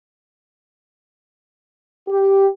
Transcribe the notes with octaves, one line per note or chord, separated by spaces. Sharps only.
G4